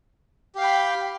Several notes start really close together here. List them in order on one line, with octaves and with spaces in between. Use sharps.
G4 F5 G5 B5